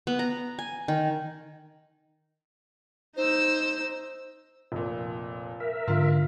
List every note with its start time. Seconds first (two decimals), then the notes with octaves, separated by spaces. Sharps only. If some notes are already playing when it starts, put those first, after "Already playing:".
0.07 B3
0.19 A#5
0.59 G#5
0.88 D#3
3.17 D#4 C5 E6
4.72 F1 A#2
5.60 A#4 E5
5.88 G#2 D3 F4